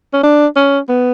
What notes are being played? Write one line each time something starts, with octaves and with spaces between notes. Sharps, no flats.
C#4
D4
C#4
B3